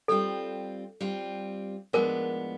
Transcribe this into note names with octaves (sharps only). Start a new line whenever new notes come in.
G3 C4 F4 A4
G3 C4 F4
A2 F3 G#3 B3 D4 A#4